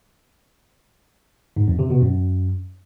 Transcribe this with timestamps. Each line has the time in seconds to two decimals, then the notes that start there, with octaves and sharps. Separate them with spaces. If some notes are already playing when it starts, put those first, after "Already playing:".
1.56 G#2
1.68 F2
1.79 C3
1.90 B2
2.01 F#2